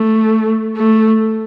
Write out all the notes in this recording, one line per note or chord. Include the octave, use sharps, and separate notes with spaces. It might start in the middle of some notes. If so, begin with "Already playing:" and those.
Already playing: A3
A3